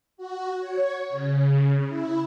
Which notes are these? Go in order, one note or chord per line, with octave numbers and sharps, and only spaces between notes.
F#4
C#5
C#3
E4